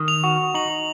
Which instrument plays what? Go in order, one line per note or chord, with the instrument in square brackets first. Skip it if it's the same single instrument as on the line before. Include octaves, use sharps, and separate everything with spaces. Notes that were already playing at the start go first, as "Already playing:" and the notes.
Already playing: [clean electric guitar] D#3
[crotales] F7
[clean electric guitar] F#4
[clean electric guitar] D#4 [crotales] F#7